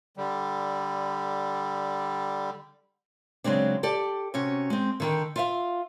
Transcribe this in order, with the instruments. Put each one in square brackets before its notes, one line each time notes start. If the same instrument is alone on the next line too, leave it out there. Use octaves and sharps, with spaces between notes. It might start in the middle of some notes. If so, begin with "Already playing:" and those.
[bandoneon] D3 G3
[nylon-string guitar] C#3 F#3 G#3 C4 D4
G4 A4 D5
C3 C#4 F#4
G#3 C4
D3 D#3 G5
F4 E5 F5